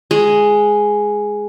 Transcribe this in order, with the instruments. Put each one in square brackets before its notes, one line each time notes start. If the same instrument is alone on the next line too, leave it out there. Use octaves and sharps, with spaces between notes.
[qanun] G#3